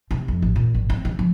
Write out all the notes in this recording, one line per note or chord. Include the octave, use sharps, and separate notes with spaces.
C3
F2
A1
A#2
G#1
C4
C#3
F3